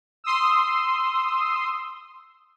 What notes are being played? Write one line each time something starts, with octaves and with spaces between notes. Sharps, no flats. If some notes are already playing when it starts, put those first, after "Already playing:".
C6 D#6 E6